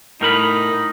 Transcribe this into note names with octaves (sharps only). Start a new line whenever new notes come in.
A2 D#4 A#4 B5